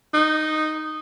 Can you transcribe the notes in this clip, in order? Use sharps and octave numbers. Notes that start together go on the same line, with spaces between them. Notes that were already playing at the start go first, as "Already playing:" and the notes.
D#4